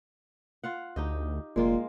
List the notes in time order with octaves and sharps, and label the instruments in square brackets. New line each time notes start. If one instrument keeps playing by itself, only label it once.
[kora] F4 F5 F#5
[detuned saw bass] D2 [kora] D#4 G4 D#5
[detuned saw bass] F1 [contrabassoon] A#2 [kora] G#3 A#3 F4